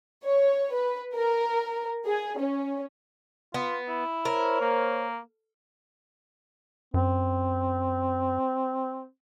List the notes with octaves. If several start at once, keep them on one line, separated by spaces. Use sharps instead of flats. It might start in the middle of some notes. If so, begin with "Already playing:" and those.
C#5
B4
A#4
G#4
C#4
B3 F4
E4
A#4 C5 C#5
A#3
F#2 C4